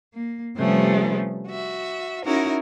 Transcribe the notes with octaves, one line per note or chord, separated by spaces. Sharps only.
A#3
C3 F3 G3 A3 B3 C#4
F#4 E5
C#4 D#4 E4 F#4 A#4